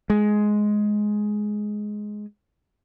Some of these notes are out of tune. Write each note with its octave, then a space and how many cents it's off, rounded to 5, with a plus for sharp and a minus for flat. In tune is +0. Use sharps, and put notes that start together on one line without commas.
G#3 +10